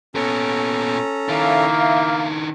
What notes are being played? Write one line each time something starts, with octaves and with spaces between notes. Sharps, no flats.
A#2 B3 C#4 A4 A#5
D#3 A#3 D4 E4 E5 F5